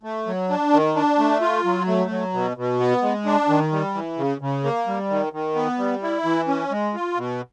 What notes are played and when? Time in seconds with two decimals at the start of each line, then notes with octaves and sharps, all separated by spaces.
0.03 A3
0.27 F#3
0.49 D4
0.73 D#3
0.96 D4
1.19 A3
1.41 F4
1.65 F#3
1.87 A3
2.10 F#3
2.34 B2
2.57 B2
2.80 B3
3.02 G#3
3.26 D4
3.49 D#3
3.72 G3
3.94 E3
4.18 C#3
4.41 C#3
4.64 A#3
4.87 G3
5.10 D#3
5.33 D#3
5.55 B3
5.78 G3
6.02 E4
6.25 E3
6.48 C#4
6.71 G#3
6.94 F4
7.17 B2